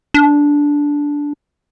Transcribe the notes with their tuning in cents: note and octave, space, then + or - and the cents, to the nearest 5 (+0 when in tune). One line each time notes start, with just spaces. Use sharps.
D4 -10